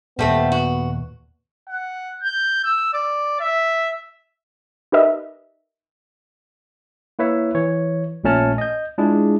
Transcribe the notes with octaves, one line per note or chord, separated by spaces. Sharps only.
D#2 A#2 G3 A3 B3 C4
F#4
F#5
G6
E6
D5
E5
D#4 G4 A#4 B4 D#5 E5
A#3 E4 B4 C#5 E5
E3 C#5
A#1 A#2 A3 C#4 A5 F6
D#5 G6
G#3 D4 E4 F4 G#4